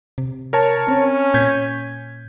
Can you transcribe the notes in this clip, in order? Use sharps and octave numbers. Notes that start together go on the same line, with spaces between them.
C3
A#4 C#5 A5
C4 C#4
A#2 G6 G#6 B6